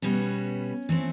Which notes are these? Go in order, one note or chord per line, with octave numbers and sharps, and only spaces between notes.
B2 G3 B3 C#4
E3 A3 C4